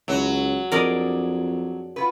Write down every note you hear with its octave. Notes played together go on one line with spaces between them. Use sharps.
C#2 F#3 E4
F2 D4 G#4 A#4 D5 D#5
F4 F#4 B4